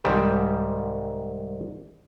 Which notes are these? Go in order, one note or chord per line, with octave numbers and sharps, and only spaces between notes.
C2 G#2 D#3 G3 G4 A5